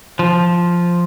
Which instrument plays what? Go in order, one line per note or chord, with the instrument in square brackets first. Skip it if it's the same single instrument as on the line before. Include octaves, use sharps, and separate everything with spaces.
[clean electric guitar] F3